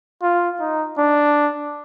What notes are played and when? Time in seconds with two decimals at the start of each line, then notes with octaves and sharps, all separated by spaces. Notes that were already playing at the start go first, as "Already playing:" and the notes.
0.22 F4
0.60 D#4
0.98 D4